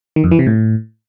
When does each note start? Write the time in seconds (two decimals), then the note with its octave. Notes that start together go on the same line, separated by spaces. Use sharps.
0.16 D#3
0.24 F2
0.31 E3
0.39 C3
0.47 A2